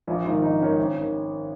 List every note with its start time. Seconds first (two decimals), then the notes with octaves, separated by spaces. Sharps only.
0.07 A#1 F4
0.25 G#2 D#3 F4
0.42 A#1 D#4
0.60 G#2 D#3 C#4
0.78 G#1
0.98 D#3